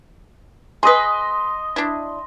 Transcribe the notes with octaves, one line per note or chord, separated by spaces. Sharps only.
G#4 B4 D#5 C6
D4 E4